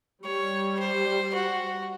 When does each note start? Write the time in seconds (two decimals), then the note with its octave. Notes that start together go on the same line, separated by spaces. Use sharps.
0.24 G3 C#5
0.79 C5
1.34 F#4